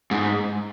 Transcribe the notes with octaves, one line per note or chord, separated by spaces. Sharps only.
G#2